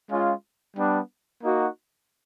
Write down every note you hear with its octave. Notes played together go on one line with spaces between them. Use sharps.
G#3 C#4 F4
G3 B3 D4
A#3 D#4 F#4